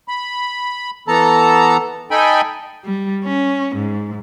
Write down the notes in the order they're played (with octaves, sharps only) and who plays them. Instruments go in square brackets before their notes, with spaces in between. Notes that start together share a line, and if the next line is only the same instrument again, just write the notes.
[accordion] B5
E3 B3 A4 A5 A#5
D#4 A4 G5 G#5 B5
[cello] G3
C#4
G#2